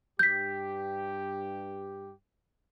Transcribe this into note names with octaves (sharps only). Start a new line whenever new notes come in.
G2 G4 G6 B6